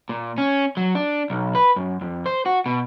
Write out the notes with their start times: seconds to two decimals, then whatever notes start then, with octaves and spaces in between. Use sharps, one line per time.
0.09 A#2
0.38 C#4
0.77 F#3
0.95 D4
1.30 B1
1.55 B4
1.76 F#2
2.01 F2
2.26 C5
2.46 F#4
2.66 B2